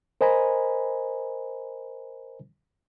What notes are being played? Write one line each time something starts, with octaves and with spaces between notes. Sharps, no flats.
A#4 C5 D#5 G#5 A#5 B5